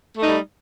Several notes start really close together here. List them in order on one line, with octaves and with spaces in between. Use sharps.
A3 D#4 G3